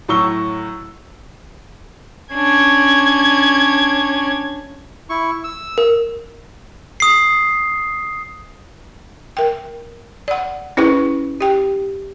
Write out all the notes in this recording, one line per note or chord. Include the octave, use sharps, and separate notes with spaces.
A2 F#3 C#6 E6 G7
C#4 D4 G#6
E4 C#6
E6
A#4
D#6 C7
A#4 G5
D5 F#5
C#4 E4 G#4 B4 C#6
G4 G5